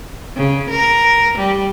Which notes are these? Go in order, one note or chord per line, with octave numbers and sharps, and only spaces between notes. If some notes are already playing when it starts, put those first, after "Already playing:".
C#3
A#4
G3